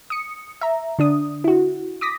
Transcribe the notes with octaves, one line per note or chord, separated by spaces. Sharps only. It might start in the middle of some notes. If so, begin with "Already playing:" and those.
D#6 C#7
E5 A#5
D3 D4 D#6
E4 F#4
D6 D#6 A#6 B6